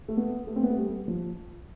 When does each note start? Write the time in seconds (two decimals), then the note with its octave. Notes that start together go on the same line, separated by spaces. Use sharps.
0.08 A3
0.17 B3
0.47 A3
0.56 C4
0.63 B3
0.70 A3
0.78 G3
1.08 F3